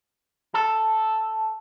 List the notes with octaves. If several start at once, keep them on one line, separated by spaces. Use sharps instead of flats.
A4